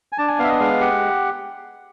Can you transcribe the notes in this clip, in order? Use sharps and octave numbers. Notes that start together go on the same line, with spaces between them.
G#5
D4 A5
G#5
B3 E5 F5
D#5
G#3 F5
G4 F#5